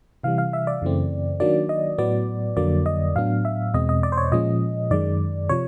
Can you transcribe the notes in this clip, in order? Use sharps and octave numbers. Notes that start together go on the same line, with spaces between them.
C3 E3 G3 F5
F5
E5
D5
F#2 C#3 E3 A3 C4
D#3 F#3 A#3 D4 D5
D#5
A2 F#3 B3 D5
F2 D3 F#3 A#3 D5
D#5
A2 F#3 B3 D4 F5
E5
E2 B2 G#3 C4 D#5
D#5
D5
C5
C#5
A#2 F3 G#3 C#4 D#5
F#2 D#3 G#3 D5
C3 F3 C#5